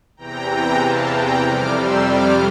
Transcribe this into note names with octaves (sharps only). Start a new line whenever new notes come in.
E2 C3 E3 G5 A#5
G5 A#5
F5 A5
G5 A#5
F2 C3 G3 D6 F6
C6 E6
D6 F6